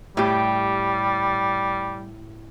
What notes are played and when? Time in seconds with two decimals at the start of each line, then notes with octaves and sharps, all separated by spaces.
0.17 A2 G3 G4